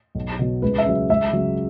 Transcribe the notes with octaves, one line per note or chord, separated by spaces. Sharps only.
B1
B2 F#3
C#2 B4
E5
C#3 F#3
C#2 E5
C#3 F#3